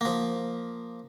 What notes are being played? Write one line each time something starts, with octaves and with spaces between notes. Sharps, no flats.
F3 A#3